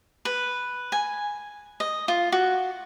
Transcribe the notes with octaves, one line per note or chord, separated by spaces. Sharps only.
B4
G#5
D#5
F4
F#4